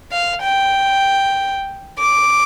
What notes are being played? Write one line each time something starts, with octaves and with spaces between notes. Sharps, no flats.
F5
G5
D6